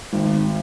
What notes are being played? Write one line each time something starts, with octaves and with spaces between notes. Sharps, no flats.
G#1